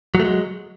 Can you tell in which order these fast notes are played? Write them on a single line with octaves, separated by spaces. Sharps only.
F#3 A3 G#3